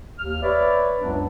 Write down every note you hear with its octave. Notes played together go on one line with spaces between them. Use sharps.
D#2 F6
B4 C#5 D5 E5
C#2 F#2 F#3 B3 D4